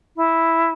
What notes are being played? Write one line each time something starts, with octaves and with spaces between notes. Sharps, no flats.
E4